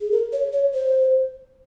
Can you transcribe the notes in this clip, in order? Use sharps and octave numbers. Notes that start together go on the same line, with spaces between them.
G#4
A#4
C#5
C#5
C5